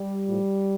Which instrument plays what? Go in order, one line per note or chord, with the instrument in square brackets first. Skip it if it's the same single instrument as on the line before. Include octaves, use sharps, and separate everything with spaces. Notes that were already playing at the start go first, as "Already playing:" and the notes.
Already playing: [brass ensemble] G3
A2 F3